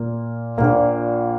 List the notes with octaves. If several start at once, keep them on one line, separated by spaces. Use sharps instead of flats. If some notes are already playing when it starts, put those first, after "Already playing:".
Already playing: A#2 A#3 F4
A#1 A#2 A#3